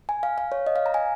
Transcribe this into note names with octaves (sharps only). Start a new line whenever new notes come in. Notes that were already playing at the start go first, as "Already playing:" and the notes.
G#5
F5
F5
C#5
D#5
F5
A#5
G#5